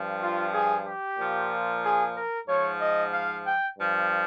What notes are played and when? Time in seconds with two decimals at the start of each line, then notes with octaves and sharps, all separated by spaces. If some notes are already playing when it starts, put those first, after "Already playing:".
Already playing: G2 F3
0.20 F4
0.52 G#4
0.84 G4
1.17 A#2 F3
1.82 G#4
2.15 A#4
2.46 G#2 F3 C#5
2.79 D#5
3.12 F5
3.45 G5
3.77 G2 F3